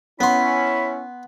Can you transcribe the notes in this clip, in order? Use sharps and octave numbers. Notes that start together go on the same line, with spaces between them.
B3 C#4 E4 B5 C6